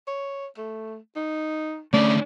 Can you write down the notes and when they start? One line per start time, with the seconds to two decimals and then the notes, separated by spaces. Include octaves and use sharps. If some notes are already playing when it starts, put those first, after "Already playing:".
0.07 C#5
0.58 A3
1.16 D#4
1.93 D3 A3 C#4 D5